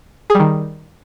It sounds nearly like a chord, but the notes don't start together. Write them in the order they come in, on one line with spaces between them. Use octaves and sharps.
G#4 G3 D#3